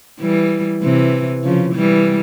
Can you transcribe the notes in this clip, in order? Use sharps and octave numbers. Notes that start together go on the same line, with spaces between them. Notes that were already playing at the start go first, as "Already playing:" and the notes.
E3 G3
C3 E3
C#3 F3
E3 G3